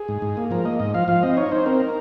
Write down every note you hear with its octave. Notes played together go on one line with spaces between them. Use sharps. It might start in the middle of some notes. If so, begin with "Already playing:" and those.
Already playing: G#4
G#2
G#2
A#3
F3 A#4
A#3 D#5
G#2 D#5
F3 F5
F3 F5
C4 D#5
D#4 C#5
D#4 C5
C4 A#4
D#4